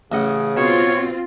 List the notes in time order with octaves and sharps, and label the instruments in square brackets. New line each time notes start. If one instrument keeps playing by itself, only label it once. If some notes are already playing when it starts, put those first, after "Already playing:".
[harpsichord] A1 D#5 F#5 [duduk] C#3
[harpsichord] B2 [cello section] C4 F4 [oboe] C#5